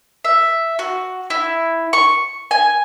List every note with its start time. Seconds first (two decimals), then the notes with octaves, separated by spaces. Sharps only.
0.24 E5
0.79 F#4
1.30 E4
1.93 C#6
2.51 G#5